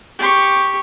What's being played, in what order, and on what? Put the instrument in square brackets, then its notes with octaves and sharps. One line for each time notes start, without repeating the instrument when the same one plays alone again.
[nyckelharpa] G4 C#6